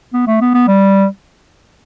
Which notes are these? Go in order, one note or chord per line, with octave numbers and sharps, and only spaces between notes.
B3
A3
B3
B3
G3